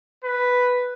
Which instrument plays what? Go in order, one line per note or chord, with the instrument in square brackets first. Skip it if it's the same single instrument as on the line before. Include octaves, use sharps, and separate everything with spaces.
[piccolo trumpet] B4